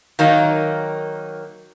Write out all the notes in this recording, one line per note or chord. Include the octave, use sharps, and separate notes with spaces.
D#3 F#3 A#3 D#4